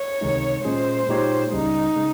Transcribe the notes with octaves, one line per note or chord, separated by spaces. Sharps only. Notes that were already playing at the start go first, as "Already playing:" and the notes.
Already playing: C#5
C#2 C3 D#3 G#3 D#4
A#2 G#3 C#4 G#4 C5
A#2 G#3 D#4 G4 C#5
C#2 C#3 G3 D#4
C#3 G#3